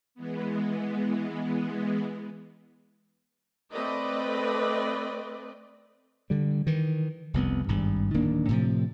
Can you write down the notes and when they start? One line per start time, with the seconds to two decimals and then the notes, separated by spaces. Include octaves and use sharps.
0.15 E3 G#3 B3
3.71 A3 C4 B4 D5 D#5
6.30 D3 G3
6.67 D#3 E3
7.34 F1 C2 B3
7.68 G#1 G2
8.14 D1 D#3 A#3 D4
8.49 A2 C3 F3